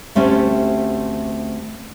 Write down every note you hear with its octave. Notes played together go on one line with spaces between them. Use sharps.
D2 A3 C4 C#4 G4 E5